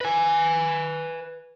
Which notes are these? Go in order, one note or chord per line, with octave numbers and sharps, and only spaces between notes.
B4 G#5